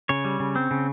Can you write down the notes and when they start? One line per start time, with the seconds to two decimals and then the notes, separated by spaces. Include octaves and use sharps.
0.09 C#3 C#5
0.25 G3
0.40 C#3
0.56 C4
0.71 C#3